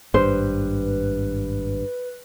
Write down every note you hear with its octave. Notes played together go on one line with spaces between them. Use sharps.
G#1 G2 B4 C5